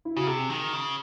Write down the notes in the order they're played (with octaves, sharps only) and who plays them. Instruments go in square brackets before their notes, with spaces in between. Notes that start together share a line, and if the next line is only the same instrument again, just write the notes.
[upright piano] E4
[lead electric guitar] C#3 [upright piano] F#4
[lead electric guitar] C3 [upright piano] G#4
[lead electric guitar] D#3
C#3